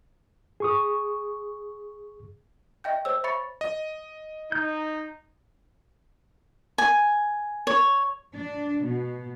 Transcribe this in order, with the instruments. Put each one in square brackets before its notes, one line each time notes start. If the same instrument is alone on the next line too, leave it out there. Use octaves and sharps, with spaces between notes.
[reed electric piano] G#4 C#6 D#6
[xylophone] D#5 E5 G5 G6
C5 C#5 E6
E5 B5 C#6 A6 C#7
[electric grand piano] D#5
[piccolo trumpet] D#4 [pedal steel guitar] G6
[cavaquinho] G#5
C#5
[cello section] D4
B2